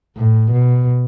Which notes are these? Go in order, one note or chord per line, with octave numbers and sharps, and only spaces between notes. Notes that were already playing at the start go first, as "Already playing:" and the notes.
A2
B2